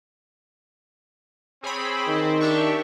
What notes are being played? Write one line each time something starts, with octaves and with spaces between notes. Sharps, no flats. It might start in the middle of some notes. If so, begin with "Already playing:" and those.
C4 G#4 C#5 B5
D#3
D4 G4 E5 C#6